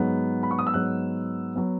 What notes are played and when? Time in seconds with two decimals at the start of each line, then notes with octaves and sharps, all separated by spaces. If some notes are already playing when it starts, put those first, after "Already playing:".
Already playing: G#2 F#3 B3
0.43 B5
0.51 C#6
0.59 D#6
0.67 E6
0.74 G#2 F#3 B3 F#6
1.56 F#3 B3